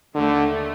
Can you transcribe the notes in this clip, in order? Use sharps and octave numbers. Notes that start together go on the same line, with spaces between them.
D#2 D3 D#3 A3